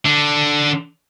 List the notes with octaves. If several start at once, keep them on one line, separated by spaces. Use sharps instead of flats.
D3 D4